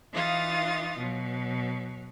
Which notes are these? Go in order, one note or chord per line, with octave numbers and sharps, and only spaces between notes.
E3 D#4 F4 F5 D#6 A6
B2 F#3